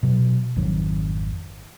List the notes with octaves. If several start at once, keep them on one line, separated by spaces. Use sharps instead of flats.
B2 F#3
G#1 F2 D#3 F#3